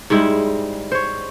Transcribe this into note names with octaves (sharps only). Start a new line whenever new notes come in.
G#2 G3 G#3 E4
C5 C#5